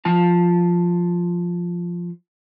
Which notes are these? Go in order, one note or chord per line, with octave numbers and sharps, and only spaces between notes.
F3 F4 A5